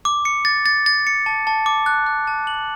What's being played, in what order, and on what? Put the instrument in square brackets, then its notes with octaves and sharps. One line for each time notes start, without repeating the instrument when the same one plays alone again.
[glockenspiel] D6
C#7
A6
A6
A6
C#7
A5
A5
D6
F#6
F#6
A5
F#7